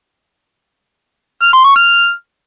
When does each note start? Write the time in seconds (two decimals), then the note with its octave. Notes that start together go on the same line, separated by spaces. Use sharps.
1.42 F6
1.53 C6
1.64 C#6
1.76 F6